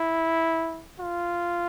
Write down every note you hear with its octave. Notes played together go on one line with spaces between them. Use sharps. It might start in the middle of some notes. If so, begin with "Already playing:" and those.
Already playing: E4
F4